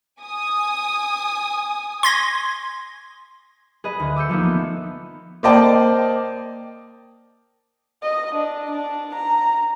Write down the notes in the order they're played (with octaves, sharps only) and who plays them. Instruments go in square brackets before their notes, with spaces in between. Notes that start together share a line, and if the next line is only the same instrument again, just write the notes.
[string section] G#5 D#6
[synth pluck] C6 G#6 A#6
[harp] G#4 B4 D#5
D2
D6 E6 G6 C#7
F3 A3 A#3 D#4
B3
[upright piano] A#3 C5 D5 D#5 G5 A5
[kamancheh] D#5
D4
D4
A#5